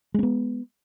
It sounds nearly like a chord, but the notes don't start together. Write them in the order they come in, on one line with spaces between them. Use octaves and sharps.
G#3 C4 B3